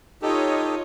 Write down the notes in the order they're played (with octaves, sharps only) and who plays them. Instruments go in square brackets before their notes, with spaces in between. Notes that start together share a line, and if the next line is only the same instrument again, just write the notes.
[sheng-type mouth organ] D#4 G4 A4 [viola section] F4 C#5 D#5